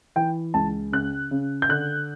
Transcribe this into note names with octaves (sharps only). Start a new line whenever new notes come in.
E3 G5
C#2 A5
C#3 F#6
C#3
G6
D3 F#6